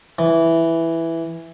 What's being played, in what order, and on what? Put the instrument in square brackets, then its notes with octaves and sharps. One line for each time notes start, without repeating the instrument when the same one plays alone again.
[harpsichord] E3